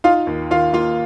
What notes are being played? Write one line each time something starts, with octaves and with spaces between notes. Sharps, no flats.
D#4 F4 F5
D#2
D#3 F4 F5
A#3 F4 F5